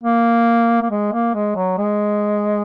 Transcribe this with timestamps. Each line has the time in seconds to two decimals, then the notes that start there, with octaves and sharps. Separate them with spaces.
0.03 A#3
0.82 A#3
0.91 G#3
1.13 A#3
1.34 G#3
1.56 F#3
1.78 G#3